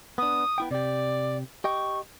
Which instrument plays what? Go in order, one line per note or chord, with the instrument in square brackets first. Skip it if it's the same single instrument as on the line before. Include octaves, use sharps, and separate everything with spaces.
[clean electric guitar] B3 D4 [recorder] D#6
[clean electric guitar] B3 E4 G5
[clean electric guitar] C3 G4 [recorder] D5
[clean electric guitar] G4 D#5 G5 [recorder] C#6